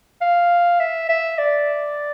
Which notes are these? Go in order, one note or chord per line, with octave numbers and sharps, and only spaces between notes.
F5
E5
E5
D5